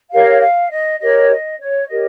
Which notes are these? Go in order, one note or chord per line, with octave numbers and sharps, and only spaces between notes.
G4 A#4 C#5 F5
F5
D#5
G4 A#4 C#5 D#5
D#5
C#5
G4 A#4 C#5 D#5